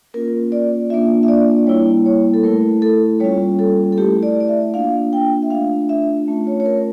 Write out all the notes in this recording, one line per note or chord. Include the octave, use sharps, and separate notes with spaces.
A#3 C#4 F4 A#4
D5
A#3 D4 F4 E5
E5
D5
G3 A#3 E4 C#5
C#5
A4
A3 E4 A#4
A4
G3 A#3 C#4 F4 C#5
A4
A4
A3 E4 G4
D5
D5
E5
A#3 D4 F4 F5
G5
E5
A3 D4 F4 F5
E5
A3 C#4 F4
C#5
C#5
A#4